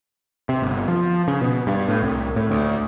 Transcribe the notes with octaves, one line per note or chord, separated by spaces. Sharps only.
C3
G1
F3
C#3
B2
G2
A2
C2
A2
D2